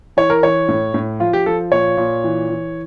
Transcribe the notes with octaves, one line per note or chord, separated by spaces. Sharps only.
E3 C#5
A#4
E3 C#5
A2
A2
F3 F4
G4
F3 A4
A#2 C#5
A#2
E3
E3